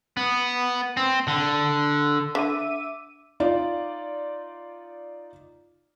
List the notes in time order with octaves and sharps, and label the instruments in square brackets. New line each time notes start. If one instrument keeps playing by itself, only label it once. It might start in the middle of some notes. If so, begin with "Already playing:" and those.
[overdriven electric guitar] B3
C4
D3
[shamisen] D3 [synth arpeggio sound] E5 D6 D#7
[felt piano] D#4 F4 D5